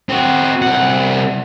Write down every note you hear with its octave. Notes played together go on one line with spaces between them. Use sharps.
C4 F#4
C2 F#5